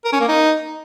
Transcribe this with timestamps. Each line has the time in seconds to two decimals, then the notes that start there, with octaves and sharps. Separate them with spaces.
0.05 A#4
0.13 C#4
0.21 A#3
0.29 D#4